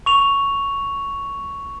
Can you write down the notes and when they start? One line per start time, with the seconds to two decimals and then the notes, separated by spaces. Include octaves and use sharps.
0.06 C#6 F7